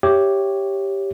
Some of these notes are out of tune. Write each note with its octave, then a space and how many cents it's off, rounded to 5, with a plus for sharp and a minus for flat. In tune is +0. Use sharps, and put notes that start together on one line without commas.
G4 +0 C#5 +0 E5 +0